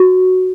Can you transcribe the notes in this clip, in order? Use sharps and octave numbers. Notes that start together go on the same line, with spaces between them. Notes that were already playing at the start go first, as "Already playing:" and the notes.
Already playing: F#4